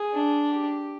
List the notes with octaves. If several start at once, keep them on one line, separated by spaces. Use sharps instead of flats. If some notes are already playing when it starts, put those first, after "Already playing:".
Already playing: G#4
D4
G4